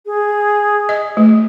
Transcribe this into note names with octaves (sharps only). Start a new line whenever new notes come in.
G#4
D#5
A3